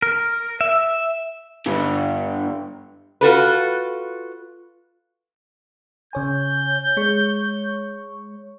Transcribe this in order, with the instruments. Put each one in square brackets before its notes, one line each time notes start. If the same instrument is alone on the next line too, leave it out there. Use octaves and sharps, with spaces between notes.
[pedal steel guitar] A#4
E5
[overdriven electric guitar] G2 D3
[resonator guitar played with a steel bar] F4 F#4 A4 B4
[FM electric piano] C#3 C#5 G#5 [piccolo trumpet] G6
[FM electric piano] G#3 C#5 C#6